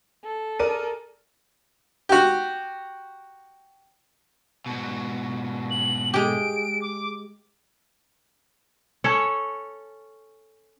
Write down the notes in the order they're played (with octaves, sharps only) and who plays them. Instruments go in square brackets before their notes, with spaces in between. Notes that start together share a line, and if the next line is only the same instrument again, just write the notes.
[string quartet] A4
[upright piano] G#4 D5 A5 [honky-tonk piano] A#4 D#7
[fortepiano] F#4 G4
[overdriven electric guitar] G#2 B2
[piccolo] F#7
[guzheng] G#3 G4 [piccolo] D7
[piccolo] D6
[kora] C#4 A4 C#5